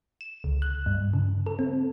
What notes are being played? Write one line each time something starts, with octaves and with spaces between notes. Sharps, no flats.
E7
C#2
F#6
G2
C#3
A4
C4